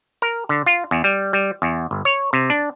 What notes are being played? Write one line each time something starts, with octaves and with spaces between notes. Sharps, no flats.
A#4
D3
F4
E2
G3
G3
E2
G1
C#5
C3
D4